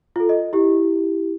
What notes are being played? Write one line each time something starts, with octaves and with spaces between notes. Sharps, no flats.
F4 A4
D#5
E4 G4